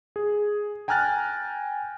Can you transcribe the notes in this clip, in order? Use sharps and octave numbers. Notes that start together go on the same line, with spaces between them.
G#4
G5 G#5 A#5 F6 F#6 A6